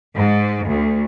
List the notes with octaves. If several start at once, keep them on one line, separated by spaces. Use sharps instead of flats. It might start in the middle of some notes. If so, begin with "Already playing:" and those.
G#2
D2